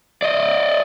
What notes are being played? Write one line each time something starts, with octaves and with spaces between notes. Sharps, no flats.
D5 D#5